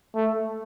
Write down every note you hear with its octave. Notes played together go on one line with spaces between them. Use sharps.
A3